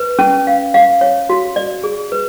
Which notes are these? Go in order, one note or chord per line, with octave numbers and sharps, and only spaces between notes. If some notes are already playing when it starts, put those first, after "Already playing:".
Already playing: B4
C#4
F5
F5
C#5
F#4
D5
G#4
B4